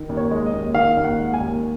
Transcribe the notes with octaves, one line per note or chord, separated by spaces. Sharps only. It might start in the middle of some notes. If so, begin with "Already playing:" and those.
Already playing: D#3
D#2
C#5
G#3
D#5
D#2
D#3 F5
D#2
F#5
G#3
G#5
D#2